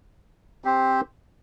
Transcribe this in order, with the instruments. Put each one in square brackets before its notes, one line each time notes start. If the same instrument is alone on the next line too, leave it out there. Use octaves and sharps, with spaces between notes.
[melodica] C4 G4 C5